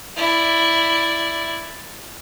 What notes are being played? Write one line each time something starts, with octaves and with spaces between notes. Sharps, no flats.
E4 D5